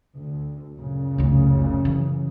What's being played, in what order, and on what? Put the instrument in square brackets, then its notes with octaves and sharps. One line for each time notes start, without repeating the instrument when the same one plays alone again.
[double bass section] D2
F#2 A#2 C#3
[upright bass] F1 C#2
E3